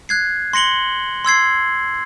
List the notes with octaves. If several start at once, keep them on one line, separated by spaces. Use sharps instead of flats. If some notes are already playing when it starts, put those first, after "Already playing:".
F#6 G#6 C7
C6 A#6 C#7 F#7 G7
C6 E6 G#6 C7